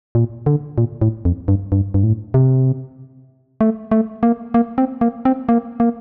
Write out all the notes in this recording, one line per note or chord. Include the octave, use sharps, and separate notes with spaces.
A#2
D3
A#2
A2
F2
G2
G2
G2
A2
C3
A3
A3
A#3
A#3
C4
A#3
C4
A#3
A#3